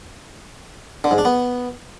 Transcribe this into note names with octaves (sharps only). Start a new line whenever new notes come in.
D3
G#2
D4
B3